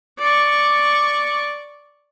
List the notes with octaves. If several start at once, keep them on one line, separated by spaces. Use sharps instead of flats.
D5 C#6